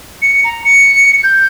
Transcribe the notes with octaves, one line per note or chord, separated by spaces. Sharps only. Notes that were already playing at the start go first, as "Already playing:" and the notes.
C#7
A#5
C#7
G6